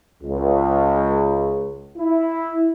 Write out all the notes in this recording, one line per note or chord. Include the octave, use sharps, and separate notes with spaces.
C#2
E4